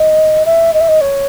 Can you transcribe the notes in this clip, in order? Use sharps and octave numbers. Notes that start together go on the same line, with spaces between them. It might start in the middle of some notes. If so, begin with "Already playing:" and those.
Already playing: D#5
E5
D#5
E5
D#5
C#5